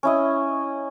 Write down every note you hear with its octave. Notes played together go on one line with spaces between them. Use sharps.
C#4 E4 D#5